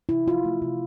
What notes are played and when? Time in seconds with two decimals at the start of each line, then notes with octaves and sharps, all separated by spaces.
0.09 C3 E4
0.26 F3 F4
0.45 A3
0.62 C3